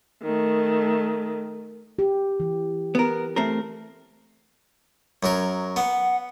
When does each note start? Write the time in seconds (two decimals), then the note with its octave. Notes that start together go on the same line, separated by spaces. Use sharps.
0.22 D#3 A3
1.99 G4
2.40 E3
2.95 B3 A#4
3.36 A3 C4 A#4
5.23 F#2 F#3 A#4
5.76 B3 F#5